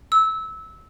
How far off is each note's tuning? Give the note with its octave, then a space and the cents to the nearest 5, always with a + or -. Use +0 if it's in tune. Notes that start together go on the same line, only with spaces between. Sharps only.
E6 -20